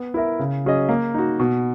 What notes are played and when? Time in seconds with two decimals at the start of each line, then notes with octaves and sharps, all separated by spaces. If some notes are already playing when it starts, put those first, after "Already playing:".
Already playing: B3
0.14 E4 A#4 E5
0.39 C#3
0.65 F#3 C#4 G#4 D#5
0.89 A#3
1.14 D#4 F#4
1.40 B2